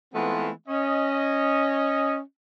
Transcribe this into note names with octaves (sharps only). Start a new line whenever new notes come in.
E3 G#3 A3 B3 C4 F4
C#4 D#5